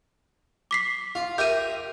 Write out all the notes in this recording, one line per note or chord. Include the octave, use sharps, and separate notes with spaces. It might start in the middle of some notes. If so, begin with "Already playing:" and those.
D6 B6 C7
F4
G4 A#4 E5 G6 D#7